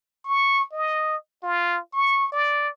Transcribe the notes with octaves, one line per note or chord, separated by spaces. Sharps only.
C#6
D#5
F4
C#6
D5